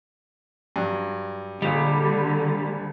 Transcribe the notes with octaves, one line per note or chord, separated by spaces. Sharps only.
G2 F#3
A#1 D3 G3 F4 D#5